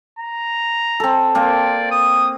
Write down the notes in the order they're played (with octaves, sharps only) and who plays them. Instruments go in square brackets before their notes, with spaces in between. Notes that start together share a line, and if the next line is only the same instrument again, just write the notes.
[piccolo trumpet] A#5
[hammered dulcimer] C4 A4
[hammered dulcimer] A#3 C4 [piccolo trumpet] D5
[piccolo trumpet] D#6